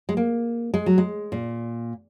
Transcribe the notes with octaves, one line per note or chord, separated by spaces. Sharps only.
G#3
A#3
G#3
F#3
G#3
A#2